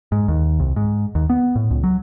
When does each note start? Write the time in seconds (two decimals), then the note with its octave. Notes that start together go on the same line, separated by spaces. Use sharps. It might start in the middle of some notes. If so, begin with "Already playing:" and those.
0.12 G#2
0.28 D#2
0.60 C2
0.76 G#2
1.15 D#2
1.30 B3
1.56 A2
1.71 C#2
1.84 F#3